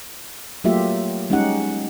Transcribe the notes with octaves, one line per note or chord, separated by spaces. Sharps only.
F#3 A3 A#3 F4 G4 E5
G3 G#3 C#4 D#4 G4 F#5